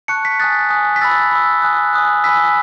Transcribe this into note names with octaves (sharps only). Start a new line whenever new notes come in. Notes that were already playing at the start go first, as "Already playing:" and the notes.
A5 C#6 F#6 C#7
B6
G#5 D#6 F#6 A6
G#5 D#6 F#6
B6
B5 E6 A6
B5 E6
G#5 D#6 F#6
G#5 D#6 F#6
G#5 B5 E6 B6